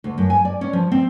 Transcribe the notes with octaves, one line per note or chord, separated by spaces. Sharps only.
D2
F#2
G#5
D5
C#4
F3
C4